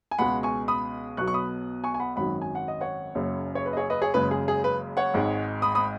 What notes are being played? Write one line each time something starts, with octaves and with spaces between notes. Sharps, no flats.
G#5
C#2 B2 G#3 F#5 B5
G#5 C#6
B5 D#6
B1 B2 F#3 C#6 F#6
C#6
B5 D#6
G#5 C#6
G#5
F#5 B5
G#1 F#2 D#3 F#3 F#5 B5
G#5
F#5
D#5
C#5 F#5
F#1 F#2 C#3 F#3
C#5
B4
D#5
G#4 C#5
B4 D#5
G#4 C#5
F#1 F#2 C#3 G#3 B4
G#4
G#4
B4
C#5 F#5
G#1 G#2 G#3
B5 D#6
B5 D#6